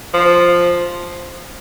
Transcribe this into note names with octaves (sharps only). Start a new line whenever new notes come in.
F3